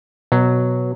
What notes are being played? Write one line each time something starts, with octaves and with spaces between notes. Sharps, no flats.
B2 F#3